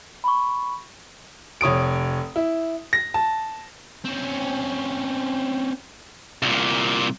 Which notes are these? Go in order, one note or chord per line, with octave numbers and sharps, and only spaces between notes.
B5 C#6
F1 C#5 D#6 D7
E4
A#6
A5
C4 C#4
C2 A#2